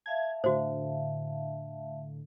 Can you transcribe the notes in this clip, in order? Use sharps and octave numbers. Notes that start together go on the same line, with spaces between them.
E5 F5 A5 G#6
A2 D3 F#4 C5